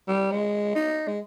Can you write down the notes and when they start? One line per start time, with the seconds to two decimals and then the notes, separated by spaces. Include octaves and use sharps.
0.08 G3
0.31 G#3
0.75 D#4
1.07 G#3